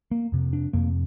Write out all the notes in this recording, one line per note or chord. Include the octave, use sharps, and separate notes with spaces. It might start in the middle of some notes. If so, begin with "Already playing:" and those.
A#3
F2 C3
D4
F2 C3 A#3